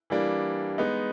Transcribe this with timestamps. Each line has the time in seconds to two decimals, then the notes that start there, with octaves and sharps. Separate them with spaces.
0.10 E3 G3 A#3 D4
0.78 G#3 B3 D#4